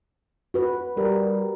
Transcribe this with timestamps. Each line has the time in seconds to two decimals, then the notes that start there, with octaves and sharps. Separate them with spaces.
0.54 F#4 B4
0.97 G3 A#4